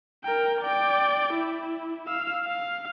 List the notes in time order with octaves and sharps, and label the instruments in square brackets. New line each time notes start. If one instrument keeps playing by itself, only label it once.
[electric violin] A#4 G5
D5 G5
E4
F5 E6
F5